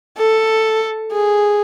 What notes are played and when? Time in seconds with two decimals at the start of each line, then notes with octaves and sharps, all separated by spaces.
0.17 A4
1.13 G#4